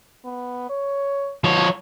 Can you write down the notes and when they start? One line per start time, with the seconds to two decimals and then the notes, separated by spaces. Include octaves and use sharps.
0.25 B3
0.69 C#5
1.44 B2 F3 C#5